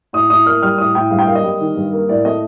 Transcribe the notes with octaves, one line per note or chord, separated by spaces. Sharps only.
A2 D#6
A2 D#6
A#3 F6
G3 F6
A2 D#6
A2 G5
G2 F5
G5
A#3 F5
D#5
G3
D#3
G2
A#3
A2 D5
A3 D#5